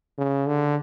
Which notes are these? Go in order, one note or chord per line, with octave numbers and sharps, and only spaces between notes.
C#3
D3